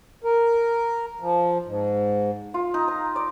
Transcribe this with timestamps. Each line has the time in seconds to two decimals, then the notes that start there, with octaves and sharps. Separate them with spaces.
0.24 A#4
1.20 F3
1.65 G#2
2.54 F4
2.74 D#4
2.88 A#5
3.16 D5